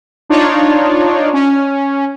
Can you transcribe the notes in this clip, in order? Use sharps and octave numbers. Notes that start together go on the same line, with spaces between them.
D4 D#4 F4 C#5 D5
C#4